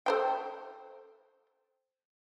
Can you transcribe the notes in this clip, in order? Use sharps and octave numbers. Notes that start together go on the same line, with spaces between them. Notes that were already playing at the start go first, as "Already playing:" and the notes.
A4 C5 G5